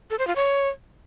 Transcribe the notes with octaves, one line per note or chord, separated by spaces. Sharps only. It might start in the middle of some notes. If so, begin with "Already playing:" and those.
A4
C5
F4
C#5